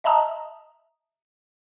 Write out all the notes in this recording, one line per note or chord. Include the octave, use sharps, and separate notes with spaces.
D#5 E5 A5 A#5 D#6